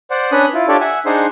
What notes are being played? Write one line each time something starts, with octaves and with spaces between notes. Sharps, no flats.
C5 D5 F#5
C#4 D4 B4 C#5 D#6 F#6
E4 F4
D4 F4 G4 A4 C#5 D5
E5 F#5 G#5
D4 D#4 G#4 C5 F#5 C6